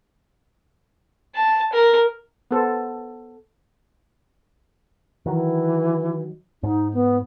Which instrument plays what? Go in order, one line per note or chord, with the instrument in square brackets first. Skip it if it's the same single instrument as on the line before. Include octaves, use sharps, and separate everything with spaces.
[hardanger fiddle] A5
A#4
[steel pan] B3 A4 C5
[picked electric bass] D#3 F#3 [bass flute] E3
[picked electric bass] G#2 [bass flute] D#4
[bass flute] B3